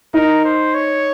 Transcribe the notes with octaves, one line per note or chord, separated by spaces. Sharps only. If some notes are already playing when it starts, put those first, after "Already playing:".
D#4 A#4
C5
C#5